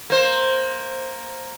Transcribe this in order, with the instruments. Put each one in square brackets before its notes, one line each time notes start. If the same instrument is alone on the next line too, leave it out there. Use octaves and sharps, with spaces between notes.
[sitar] A#3 C5